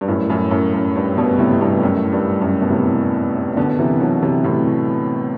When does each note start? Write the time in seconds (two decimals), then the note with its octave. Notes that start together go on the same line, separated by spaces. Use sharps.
0.01 G2
0.08 F#2 A2
0.30 F#2 A2
0.51 F#2
0.74 F#2
0.95 G2
1.17 G2 B2
1.39 A2 C3
1.52 C3
1.61 G2 B2
1.83 F#2 A2
2.12 G2
2.41 F#2
2.62 B2
2.70 A2 C3
3.57 B2 D3
3.79 C3 E3
4.01 D3 F#3
4.22 C3 E3
4.44 A2 C3